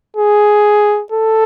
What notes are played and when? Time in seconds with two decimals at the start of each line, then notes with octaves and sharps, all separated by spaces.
0.17 G#4
1.12 A4